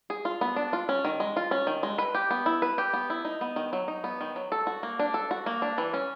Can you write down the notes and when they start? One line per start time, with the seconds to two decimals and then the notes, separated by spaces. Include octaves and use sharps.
0.10 G#4
0.25 F4
0.41 B3
0.56 D4
0.73 F4
0.89 C#4
1.05 D#3
1.20 G#3
1.37 F4
1.51 C#4
1.67 D#3
1.83 G#3
1.98 B4
2.14 G4
2.31 B3
2.46 E4
2.62 B4
2.78 G4
2.93 B3
3.10 E4
3.25 D#4
3.41 B3
3.56 D#3
3.73 F#3
3.88 D#4
4.04 B3
4.21 D#3
4.36 F#3
4.52 A4
4.67 F#4
4.83 A#3
4.99 D4
5.14 A4
5.31 F#4
5.46 A#3
5.62 D4
5.78 E3
5.94 C#4